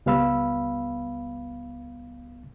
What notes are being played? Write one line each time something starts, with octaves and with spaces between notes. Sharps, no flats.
C#2 G3 B3 F5 B5 E6